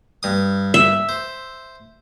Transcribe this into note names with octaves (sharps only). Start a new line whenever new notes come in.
G2 D#6
E5
C5